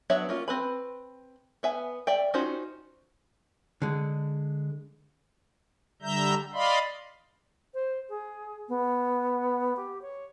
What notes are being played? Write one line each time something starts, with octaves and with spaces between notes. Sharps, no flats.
F#3 B3 D4 C#5 E5
A#3 C#4 F4
C4 B4 B5
B3 E5 G#5
D5 E5 G5
C#4 D#4 F4 F#4 C5
D3 G#3
D3 G3 E5 A#5 G6
D5 D#5 F5 B5 C6
C5
G#4
B3
G4
C#5